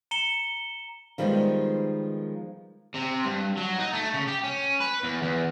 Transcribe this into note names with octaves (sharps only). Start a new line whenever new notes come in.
A#5 C#7 E7 G7
D#3 F3 G3 G#3 B3 D#4
C3
G2
F#3
D#4
A3
C#3
G4
C#4
B4
E2
E2